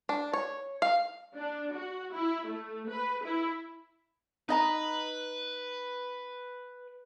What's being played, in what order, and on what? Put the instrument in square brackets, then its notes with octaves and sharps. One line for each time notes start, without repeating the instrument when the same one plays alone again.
[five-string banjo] D4
C#5
F5
[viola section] D4
F#4
E4
A3
B4
E4
[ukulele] D#4 D#5 A#5 [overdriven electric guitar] B4